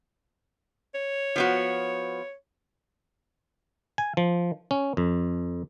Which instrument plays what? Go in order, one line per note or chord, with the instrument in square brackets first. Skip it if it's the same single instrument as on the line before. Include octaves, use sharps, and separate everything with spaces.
[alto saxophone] C#5
[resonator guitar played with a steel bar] F3 B3 F#4
[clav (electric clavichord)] G#5
F3
C#4
F2